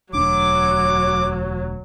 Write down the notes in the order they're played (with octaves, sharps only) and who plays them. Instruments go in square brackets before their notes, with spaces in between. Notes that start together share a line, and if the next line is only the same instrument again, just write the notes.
[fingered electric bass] E1 D2 D4 [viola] F#3 [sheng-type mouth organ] D6